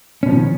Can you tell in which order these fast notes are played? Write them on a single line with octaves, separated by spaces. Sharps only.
C#4 B2 F3 D#3